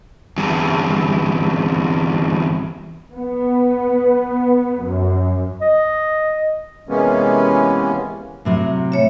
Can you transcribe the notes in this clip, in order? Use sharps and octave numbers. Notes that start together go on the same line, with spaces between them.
E2 G2
B3
F#2
D#5
C3 E3 G#3 A#3 B3 C#4
A2 C3 F#3
A3 C#5 E5